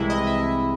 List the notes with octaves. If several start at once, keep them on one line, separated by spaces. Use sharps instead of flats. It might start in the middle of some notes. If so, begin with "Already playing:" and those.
Already playing: C2 C3 E3 G#3 E4
D#5
E5